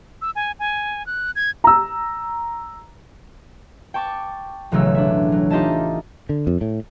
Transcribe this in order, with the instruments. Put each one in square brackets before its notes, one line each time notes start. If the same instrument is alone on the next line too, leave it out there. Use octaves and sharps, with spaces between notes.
[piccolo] E6
G#5
G#5
F#6
G#6
[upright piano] A#5 E6
[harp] G5 A5 C#6 D6 A6
E1 A1 C#3 F#3 A3 E6
D4 E5
F#3
D#4 F4 G4 D#5 E5 A5
[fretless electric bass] D3
F2
A2